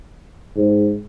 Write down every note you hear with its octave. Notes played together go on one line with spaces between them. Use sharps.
G#2